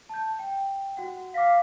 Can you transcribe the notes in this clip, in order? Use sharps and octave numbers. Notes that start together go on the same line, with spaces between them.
A5 G6
G5
F#4 F#5
F5 D6 A#6 B6